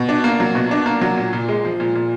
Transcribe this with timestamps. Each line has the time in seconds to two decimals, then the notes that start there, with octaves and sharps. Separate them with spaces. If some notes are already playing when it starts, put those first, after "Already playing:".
Already playing: B2
0.09 D4
0.24 A#3
0.40 F#3
0.55 B2
0.71 D4
0.86 A#3
1.01 F#3
1.17 A#2
1.33 A#2
1.49 G#3
1.65 F3
1.80 A#2
1.95 A#2